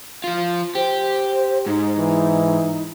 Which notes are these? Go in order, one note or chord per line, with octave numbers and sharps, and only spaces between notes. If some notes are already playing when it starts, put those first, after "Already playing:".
F3 F4
G4 C5
G#2 D#4
E3